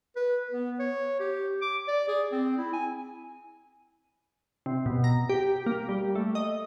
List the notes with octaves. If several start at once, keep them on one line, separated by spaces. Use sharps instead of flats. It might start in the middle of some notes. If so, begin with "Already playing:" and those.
B4
B3
C#5
G4
D6
D5
G#4
C4
E4
G#5
C3
B2
A#5
G4
A#3
G3
A3
D#5